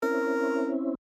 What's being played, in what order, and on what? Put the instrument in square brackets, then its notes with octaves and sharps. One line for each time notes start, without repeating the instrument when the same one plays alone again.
[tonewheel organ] C4 C#4 E4 [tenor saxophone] A#4